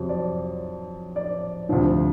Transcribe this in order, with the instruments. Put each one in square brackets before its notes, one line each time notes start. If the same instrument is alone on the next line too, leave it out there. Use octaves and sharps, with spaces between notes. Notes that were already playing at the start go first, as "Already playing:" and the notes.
Already playing: [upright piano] F2 C3 F#3
D5
D5
D2 C3 F3